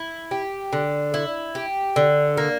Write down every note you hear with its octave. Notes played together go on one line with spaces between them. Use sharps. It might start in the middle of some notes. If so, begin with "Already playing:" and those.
Already playing: E4
G4
D3
E4
G4
D3
A#3